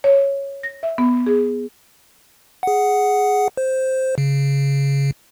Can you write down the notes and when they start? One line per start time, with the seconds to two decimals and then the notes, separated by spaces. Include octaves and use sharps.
0.04 C#5
0.63 A#6
0.83 E5
0.98 B3
1.27 G#4
2.63 G#4 F#5
3.57 C5
4.18 C#3